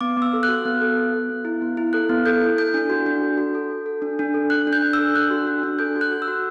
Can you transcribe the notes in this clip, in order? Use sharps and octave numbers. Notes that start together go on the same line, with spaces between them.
B3 D6
B3 E6
A4
F#6
F#4
B3
A4
B3
B3
B3
E4
B3
E4
A4 F#6
B3
A4 G6
E4
A4 G6
D4
F#4
D4
A4
F#4
A4
F#4
A4
D4
D4
A4
D4 F#6
D4
G6
D4
E6
A4
D4 F#6
F#4
D4
D4
A4 G6
F#4
F#6
F#4
E6
F#4